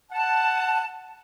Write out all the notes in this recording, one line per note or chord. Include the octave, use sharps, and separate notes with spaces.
F#5 A5